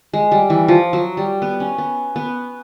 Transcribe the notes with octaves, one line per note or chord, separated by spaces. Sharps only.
G#3
G3
E3
F3
F#3
G3
B3
C#4
B3
B3